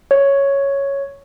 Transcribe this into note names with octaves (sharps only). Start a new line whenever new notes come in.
C#5